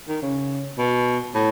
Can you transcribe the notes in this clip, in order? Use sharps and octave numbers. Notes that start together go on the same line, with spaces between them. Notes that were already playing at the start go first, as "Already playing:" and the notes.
D#3
C#3
B2
A2